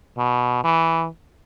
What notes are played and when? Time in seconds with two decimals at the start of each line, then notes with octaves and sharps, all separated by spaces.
0.17 B2
0.64 E3